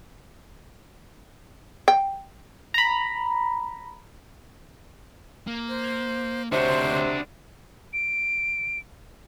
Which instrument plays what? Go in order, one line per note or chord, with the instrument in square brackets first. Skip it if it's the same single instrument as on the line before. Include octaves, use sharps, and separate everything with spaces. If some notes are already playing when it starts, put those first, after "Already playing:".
[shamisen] G5
[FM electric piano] A#5 B5
[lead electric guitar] A#3
[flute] C5
[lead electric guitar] D2 C#5 [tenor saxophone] C3 [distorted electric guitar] D4 F#4 [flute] C5
[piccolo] D7